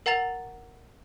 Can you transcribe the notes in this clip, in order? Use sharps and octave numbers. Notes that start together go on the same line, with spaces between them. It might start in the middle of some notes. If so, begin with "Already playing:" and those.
A#4 F#5 A#5 A6 F7